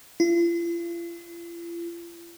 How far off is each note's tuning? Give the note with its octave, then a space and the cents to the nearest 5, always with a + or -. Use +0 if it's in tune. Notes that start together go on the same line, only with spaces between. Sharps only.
F4 -45